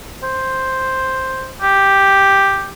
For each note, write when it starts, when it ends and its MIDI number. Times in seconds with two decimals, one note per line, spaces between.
0.23 1.52 72
1.61 2.71 67